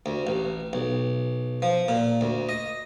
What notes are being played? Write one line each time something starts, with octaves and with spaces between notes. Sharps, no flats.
D2
A1
B1
F3
A#2
D2
D#5